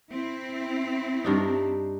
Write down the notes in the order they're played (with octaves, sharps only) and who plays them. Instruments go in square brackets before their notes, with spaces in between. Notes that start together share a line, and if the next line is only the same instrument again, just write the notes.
[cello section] C4 E4
[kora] G2 D4 D#4